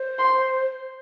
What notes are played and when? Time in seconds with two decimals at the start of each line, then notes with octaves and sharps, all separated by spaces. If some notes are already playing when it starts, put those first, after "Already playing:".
Already playing: C5
0.19 C6